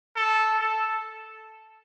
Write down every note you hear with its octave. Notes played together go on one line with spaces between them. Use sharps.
A4
A4